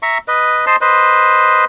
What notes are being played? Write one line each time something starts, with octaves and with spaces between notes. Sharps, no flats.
E5 A#5 C#6
B4 D#5
C5 D#5 A5 C6
B4 C5 D#5